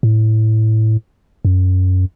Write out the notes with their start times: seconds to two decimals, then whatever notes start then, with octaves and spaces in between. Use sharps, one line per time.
0.03 A2
1.45 F#2